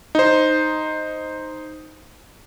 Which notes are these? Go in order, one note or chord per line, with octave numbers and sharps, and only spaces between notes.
D#4 C5